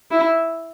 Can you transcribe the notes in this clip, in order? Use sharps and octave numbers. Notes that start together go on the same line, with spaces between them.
E4